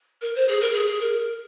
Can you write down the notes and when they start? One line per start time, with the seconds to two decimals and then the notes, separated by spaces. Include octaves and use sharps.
0.22 A#4
0.36 C5
0.48 G#4
0.61 A#4
0.74 G#4
0.87 G#4
1.01 A#4